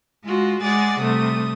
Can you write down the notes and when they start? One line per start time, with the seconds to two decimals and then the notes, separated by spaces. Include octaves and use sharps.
0.24 G#3 F4 F#4
0.62 G#3 G#4 D5 F#5 A6
0.99 C3 G3 A3 D#6